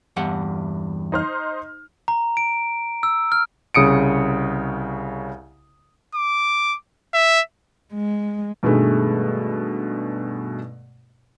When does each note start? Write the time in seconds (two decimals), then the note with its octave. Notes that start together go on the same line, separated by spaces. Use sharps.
0.16 E2 G2 F#5
1.12 D#4 C5 F6
2.08 A#5
2.37 D7
3.03 E6
3.32 F6
3.75 C2 C#3 D#6 C#7 D7
6.15 D6
7.14 E5
7.93 G#3
8.63 G2 B2 D#3 G#3 A3